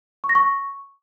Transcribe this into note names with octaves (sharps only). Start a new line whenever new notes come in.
C#6
A#6
C#6